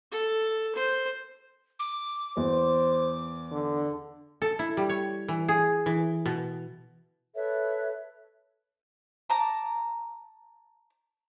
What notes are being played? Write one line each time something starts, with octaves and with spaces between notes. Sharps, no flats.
A4
C5
D6
E2 C5
D3
A4
E4
G3
C#5
E3
G#4
E3
B2
A4 B4 C#5 E5
A5 A#5 D6